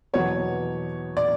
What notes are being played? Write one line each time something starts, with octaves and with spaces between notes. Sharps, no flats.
E2 B2 F#3 B3 C#5
D5